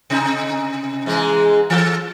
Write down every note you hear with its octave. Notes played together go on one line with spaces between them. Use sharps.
C3 D#4
G#2 E3 G#3
E3 A4